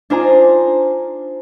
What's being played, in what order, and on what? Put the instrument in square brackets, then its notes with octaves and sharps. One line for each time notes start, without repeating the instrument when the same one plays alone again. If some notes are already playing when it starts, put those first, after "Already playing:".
[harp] D4 D#4 F4 C5 G#5 A#5